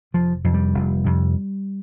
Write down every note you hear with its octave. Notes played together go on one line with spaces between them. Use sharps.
F1 F3
F2 C3 F3
G3
F1
F2 C3